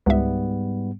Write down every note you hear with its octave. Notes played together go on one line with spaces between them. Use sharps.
C#2 G#2 G3 B3 E5